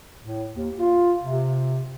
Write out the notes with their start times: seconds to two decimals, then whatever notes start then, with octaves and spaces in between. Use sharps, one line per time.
0.24 A2
0.55 D#2
0.78 F4
1.24 C3